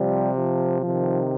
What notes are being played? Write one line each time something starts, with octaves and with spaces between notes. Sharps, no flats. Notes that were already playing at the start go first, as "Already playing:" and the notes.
Already playing: C3 F3 G3
F3
C3 D#3 F3